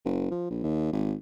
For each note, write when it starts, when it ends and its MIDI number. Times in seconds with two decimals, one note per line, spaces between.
0.05 0.29 30
0.31 0.49 53
0.50 0.63 34
0.64 0.92 39
0.93 1.15 32